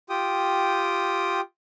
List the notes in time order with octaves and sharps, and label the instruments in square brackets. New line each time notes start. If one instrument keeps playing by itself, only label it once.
[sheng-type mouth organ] F4 G4 G5 D#6